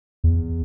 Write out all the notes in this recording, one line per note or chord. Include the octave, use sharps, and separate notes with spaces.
E2